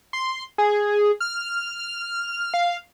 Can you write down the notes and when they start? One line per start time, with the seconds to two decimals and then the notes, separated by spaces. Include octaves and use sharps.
0.13 C6
0.58 G#4
1.21 F6
2.54 F5